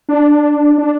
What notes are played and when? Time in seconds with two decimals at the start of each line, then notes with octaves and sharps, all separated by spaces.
0.09 D4
0.78 D4